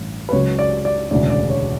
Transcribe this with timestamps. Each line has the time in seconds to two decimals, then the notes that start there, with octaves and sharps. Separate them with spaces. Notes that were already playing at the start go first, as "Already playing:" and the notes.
Already playing: A1 G2 E3
0.29 B4
0.32 C#2 C#3 F#3 C#5
0.59 D5
0.85 D5
1.11 E1 D2 C#3 F#3 D5
1.30 D5
1.50 C#5